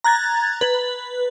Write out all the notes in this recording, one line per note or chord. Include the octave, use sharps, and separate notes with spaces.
A#5 F#6 G#6 A6
B4